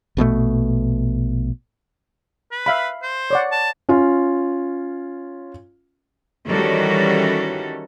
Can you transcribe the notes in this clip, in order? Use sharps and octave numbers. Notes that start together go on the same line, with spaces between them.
A#1 B2 D#3 A3
B4
E5 F5 B5
C5
C#5 D5 F#5
A5
C#4 F4
D#3 E3 G3 C#4 F#4 A4